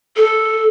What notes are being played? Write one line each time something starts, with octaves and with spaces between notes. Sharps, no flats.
A4